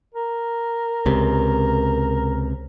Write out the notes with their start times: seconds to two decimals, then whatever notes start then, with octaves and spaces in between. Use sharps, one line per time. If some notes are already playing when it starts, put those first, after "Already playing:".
0.14 A#4
1.06 C#2 C3